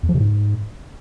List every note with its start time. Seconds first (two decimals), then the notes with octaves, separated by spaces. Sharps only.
0.03 E2
0.09 F3
0.14 C3
0.20 G#2